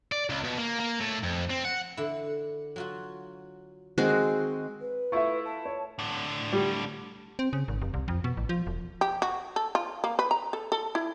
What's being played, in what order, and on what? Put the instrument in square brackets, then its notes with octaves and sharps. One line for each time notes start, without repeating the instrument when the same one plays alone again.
[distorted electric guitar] D5
C#2
B2
A#3
A#3
A2
F2
C4
F#5
[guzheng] D3 E4
F#3 F4 F#4
[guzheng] D#3 [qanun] G#3 C4 F#4
[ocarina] B4
[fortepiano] A3 E4 F4 [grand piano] E5 C#6
[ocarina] A5
[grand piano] C#5
[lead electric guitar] A2 D3
[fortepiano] G3
[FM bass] C4
C#3
G#1
F1
C2
F2
B2
A1
F3
E1
[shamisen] G4
F#4
A4
F4
A#3
B4
A#5
A4
A4
E4